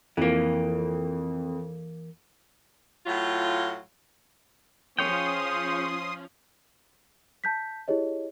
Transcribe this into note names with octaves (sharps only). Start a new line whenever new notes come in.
F2 E3 A#3
A2 F#3 F4
F3 C#4 G#4 C#5 G5 C6 D#6
A5 G6 B6
E4 G4 G#4 C#5 D#5